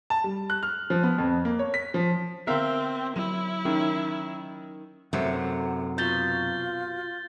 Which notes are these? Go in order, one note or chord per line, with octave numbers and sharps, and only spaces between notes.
A5
G3
F#6
F6
F3
B3
F2
A#3
C#5
B6
F3
D3 B3 C4 A#4 E5 F5
F#3 E4
D#3 C#4
F#2 C3 A3 F#5
B2 F4 G6 A6 G7